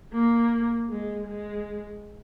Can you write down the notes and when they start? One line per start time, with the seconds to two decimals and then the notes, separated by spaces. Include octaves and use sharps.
0.12 A#3
0.89 G#3
1.27 G#3